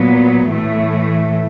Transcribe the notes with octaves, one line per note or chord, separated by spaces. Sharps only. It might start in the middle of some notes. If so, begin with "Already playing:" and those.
Already playing: A#2 F#3 B3
A2 E3 A3